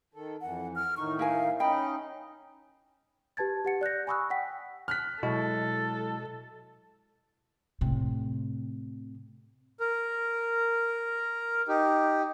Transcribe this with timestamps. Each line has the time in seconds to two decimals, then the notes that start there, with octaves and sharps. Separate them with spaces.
0.14 D#3 A4
0.41 F2 E3 F#5
0.76 F6
0.97 A2 D#3 D#4 C#6
1.19 E4 A#4 F5 G#5
1.60 C#4 D#4 D#5 G5 B5
3.37 G4 B4 A5 G#6 A6
3.65 G4 F#5 C#7
3.81 D5 F#6 G6 A#6
4.07 G#5 B5 C#6 D#6 E6 F#6
4.30 F#5 G5 B6
4.88 F6 F#6 B6
5.23 B2 F#3 G#3 E4 A4
7.81 A2 C3
9.80 A#4
11.68 D#4 G4